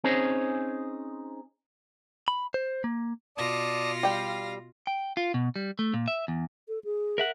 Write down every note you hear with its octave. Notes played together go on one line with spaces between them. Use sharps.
C4 C#4 D#4 G#4 C5 C#5
B5
C5
A#3
B2 F4 D5 A5 D#6 A#6
G3 F5 G5
G5
F4
B2
G3
A3
A#2
E5
E2
A4
G#4
A#4 E5 F#5